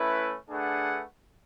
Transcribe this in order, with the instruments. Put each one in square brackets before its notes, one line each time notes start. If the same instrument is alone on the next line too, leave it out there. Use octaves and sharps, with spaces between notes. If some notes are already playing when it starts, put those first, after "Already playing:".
Already playing: [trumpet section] A3 C#4 E4 B4
A3 D4 G#4 B4 F#5